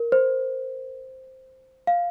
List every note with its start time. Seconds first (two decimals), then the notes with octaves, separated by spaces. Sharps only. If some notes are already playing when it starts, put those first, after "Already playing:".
Already playing: A#4
0.12 C5
1.87 F5